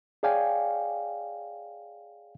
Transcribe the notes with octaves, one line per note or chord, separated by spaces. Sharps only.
G#4 C#5 D5 F5 G5 G#5